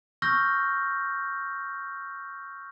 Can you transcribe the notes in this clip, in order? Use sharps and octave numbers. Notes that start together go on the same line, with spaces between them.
C#6 E6 F6 G6 A#6